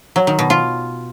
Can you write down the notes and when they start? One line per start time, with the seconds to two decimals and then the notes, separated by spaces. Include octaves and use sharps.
0.16 F#3
0.27 D#3
0.39 B2
0.50 F4